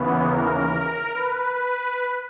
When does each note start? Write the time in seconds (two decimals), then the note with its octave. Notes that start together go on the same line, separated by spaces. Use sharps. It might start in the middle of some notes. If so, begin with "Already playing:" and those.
Already playing: D#2 C#3 E3 B3
0.25 A#4
1.13 B4